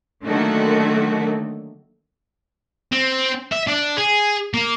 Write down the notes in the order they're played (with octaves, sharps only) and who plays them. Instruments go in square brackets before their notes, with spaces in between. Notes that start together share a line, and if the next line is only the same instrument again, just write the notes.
[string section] D3 D#3 F#3 A3 A#3 F#4
[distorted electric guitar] C4
E5
D4
G#4
A#3